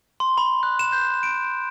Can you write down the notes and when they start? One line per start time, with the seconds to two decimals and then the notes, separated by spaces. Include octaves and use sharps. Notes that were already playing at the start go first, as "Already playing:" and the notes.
0.20 C6
0.38 B5
0.63 F#6
0.79 E7
0.92 G6
1.23 D7